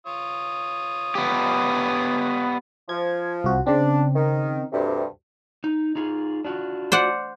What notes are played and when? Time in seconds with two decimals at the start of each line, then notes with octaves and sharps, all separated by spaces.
0.06 F4 C#5 D#6
1.15 B3 G4
2.89 F3 G#6
3.44 C2 F#4
3.67 C#3 C4 D4
4.15 D#3
4.73 D2 G2 C3
5.64 D#4
5.96 D#4 F4 G#4
6.44 D4 F4 F#4
6.92 C5 D5 F#5